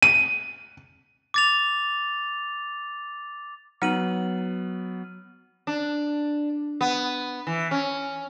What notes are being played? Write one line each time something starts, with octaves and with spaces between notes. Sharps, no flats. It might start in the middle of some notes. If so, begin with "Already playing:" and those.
D#7
D6 A6 F7
F#3 B3 D#4 F#5 F6 D#7 F#7
D4
B3
E3
C#4